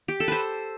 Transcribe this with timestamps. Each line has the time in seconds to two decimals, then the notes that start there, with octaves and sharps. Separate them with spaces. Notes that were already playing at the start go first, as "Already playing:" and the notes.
0.08 G4
0.20 A4
0.28 B4 C5